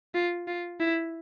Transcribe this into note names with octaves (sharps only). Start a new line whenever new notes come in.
F4
F4
E4